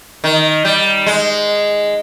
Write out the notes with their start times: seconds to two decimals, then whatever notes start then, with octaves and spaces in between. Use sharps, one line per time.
0.24 D#3
0.65 G3
1.07 G#3